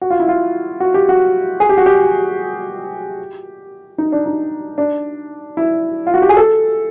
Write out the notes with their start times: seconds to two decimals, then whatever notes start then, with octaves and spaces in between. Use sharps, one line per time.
0.01 F#4
0.10 F4
0.19 E4
0.28 F4
0.80 F#4
0.94 G4
1.09 F#4
1.60 G#4
1.69 G4
1.78 F#4
1.86 G4
3.98 D#4
4.12 D4
4.26 D#4
4.78 D4
5.57 E4
6.07 F4
6.14 F#4
6.22 G4
6.29 G#4
6.37 A4